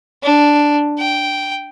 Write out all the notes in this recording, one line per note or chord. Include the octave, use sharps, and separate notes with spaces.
D4
G5